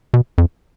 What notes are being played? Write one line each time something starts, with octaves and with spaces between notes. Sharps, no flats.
B2
F2